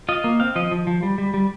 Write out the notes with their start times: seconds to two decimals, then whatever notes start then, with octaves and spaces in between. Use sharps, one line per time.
0.09 F4 D#5
0.24 A#3
0.40 C4 F5
0.56 F3 D#5
0.71 F3
0.87 F3
1.03 G3
1.18 G3
1.34 G3